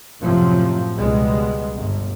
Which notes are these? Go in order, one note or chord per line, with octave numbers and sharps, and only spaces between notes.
F#2 A2 C3 F3 F#3
C#2 B2 G3 G#3 B3
G1